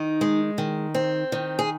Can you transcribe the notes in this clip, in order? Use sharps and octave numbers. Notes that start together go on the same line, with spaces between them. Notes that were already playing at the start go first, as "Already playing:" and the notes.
Already playing: D#3 D#4
G#3
D#3
C4
D#3
G#4